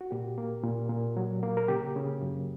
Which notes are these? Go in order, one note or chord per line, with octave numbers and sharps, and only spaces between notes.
F#4
A#2 G4
A#3
A#2
A#2
F#3
A#3
A#4
C#3 G4
C#3
F#2